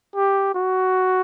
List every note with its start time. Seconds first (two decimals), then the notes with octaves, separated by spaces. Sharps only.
0.16 G4
0.55 F#4